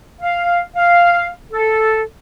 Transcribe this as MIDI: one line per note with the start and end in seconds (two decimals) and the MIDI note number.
0.21 0.60 77
0.76 1.28 77
1.52 2.02 69